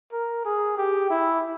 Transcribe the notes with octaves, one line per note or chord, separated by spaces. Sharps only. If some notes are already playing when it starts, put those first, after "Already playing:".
A#4
G#4
G4
E4